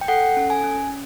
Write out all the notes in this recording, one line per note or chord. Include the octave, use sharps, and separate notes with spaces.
G5
A4 F#5
C#4
G#5
C#4